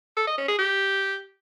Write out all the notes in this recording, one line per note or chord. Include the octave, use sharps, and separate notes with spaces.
A4
D#5
C#4
G#4
G4